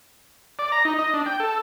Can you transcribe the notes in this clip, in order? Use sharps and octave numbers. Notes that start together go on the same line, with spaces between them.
D5
A#5
D#4
D#5
D4
G5
A4